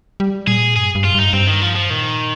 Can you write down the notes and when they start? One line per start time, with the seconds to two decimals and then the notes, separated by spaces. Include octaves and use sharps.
0.20 G3
0.47 A#2 G#4
0.76 G2 G#4
0.95 G2
1.04 F4
1.14 G2 D#4
1.33 G2 C4
1.47 D#3
1.62 F3
1.76 F3
1.90 A#2 D#3